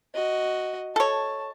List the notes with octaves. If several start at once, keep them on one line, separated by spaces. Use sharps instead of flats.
F#4 D#5
A4 C#5 A5